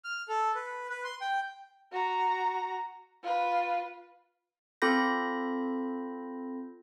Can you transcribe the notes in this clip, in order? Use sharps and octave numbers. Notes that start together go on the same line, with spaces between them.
F6
A4
B4
B4
C6
G5
F#4 A#5
F4 B4
C4 F4 A4 B5 G6 A#6